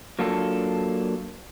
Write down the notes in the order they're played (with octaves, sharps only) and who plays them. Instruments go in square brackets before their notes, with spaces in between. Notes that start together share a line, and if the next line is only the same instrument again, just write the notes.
[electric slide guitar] F#3 A#3 D4 F4 A4